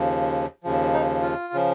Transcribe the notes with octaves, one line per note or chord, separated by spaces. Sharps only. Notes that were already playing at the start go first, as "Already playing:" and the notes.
Already playing: D#2 C#3 F3
D#2 C#3 F3
D#4
F4
C#3 F3